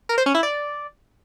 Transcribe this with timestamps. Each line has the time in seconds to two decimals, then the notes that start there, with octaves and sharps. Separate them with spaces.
0.09 A#4
0.18 C5
0.26 C#4
0.34 E4
0.43 D5